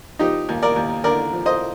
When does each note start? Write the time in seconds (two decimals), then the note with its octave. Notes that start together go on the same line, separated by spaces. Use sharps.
0.19 F3 D#4 G4
0.49 D#2
0.62 A#4 D5
0.76 D#2
1.04 D3 A#4 D5
1.33 F3
1.46 C5 D#5